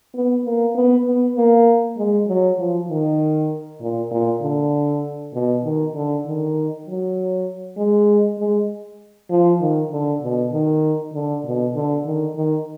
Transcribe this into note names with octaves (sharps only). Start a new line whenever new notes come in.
B3
A#3
B3
B3
A#3
G#3
F#3
F3
D#3
A#2
A#2
D3
B2
D#3
D3
D#3
F#3
G#3
G#3
F3
D#3
D3
B2
D#3
D3
B2
D3
D#3
D#3